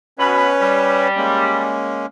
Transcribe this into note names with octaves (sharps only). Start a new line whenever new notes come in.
B2 C#4 B4 C#5 B5
G3
G#3 A#3 C#4